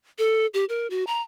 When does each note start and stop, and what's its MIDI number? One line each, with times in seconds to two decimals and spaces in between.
0.18 0.47 69
0.54 0.65 67
0.69 0.87 70
0.90 1.06 66
1.07 1.22 82